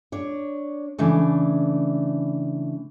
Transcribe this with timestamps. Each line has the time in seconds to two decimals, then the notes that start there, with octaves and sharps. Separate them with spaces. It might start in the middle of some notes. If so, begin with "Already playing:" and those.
0.12 D4 C#5
0.98 C#3 E3 A3 D4